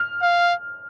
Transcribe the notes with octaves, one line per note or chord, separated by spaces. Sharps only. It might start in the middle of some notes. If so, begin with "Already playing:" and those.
Already playing: F6
F5